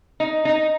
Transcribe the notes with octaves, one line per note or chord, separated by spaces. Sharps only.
D#4
D#4